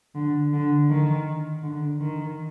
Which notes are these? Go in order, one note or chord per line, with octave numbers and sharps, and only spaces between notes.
D3
D3
D#3
D3
D#3